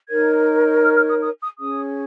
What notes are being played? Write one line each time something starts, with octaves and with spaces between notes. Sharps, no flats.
D#4 A#4 C#5 G#6
F6
F6
D#6
D#6
D#6
C#4 G#4 C#5 D#6